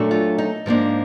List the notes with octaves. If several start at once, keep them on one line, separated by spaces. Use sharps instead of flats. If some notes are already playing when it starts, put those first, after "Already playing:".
Already playing: A#2 F#3 A3 D4
F4
D#4
G#2 F3 A#3 D4